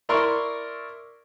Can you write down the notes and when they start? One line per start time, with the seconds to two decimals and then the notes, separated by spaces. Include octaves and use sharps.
0.09 E4 A#4 D5 E5 C6 C#6